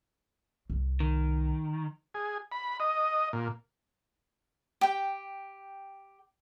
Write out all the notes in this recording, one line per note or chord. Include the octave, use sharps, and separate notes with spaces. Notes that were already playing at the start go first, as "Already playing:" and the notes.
C2
D#3
G#4
B5
D#5
A#2
G4 G5